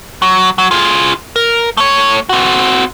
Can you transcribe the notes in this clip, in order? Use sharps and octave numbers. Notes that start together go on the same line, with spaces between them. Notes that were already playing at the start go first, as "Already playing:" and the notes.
F#3
F#3
F4 G#4
A#4
A3 C#5
C4 F#4